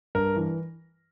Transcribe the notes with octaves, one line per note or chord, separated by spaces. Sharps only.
G2 A#4
E3